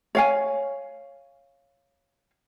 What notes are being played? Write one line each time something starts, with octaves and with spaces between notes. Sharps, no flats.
C#5 F5 G#5